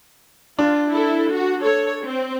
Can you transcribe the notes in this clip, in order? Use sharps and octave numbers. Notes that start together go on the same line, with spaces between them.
D4 F4
E4 A4
F#4
A4 C#5
C4